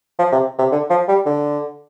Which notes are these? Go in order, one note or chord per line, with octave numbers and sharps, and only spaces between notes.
F3
C3
C3
D3
F3
G3
D3